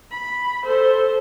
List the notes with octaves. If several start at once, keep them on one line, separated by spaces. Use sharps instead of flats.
B5
A4 C5